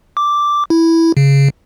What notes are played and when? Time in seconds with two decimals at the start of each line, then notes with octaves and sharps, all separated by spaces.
0.17 D6
0.70 E4
1.17 C#3